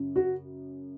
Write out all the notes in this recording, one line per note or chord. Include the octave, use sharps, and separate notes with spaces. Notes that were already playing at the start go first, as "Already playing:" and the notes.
Already playing: F#2 C#3
F#4